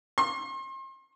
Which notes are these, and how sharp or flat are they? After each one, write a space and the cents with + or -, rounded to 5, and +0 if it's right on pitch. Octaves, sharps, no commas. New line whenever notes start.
C6 +40